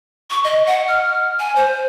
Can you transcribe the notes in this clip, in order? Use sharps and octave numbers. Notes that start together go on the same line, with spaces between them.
C#6
D#5
F#5
F6
G#5
C5